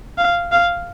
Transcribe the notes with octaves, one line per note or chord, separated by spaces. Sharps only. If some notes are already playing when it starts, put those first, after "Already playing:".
F5
F5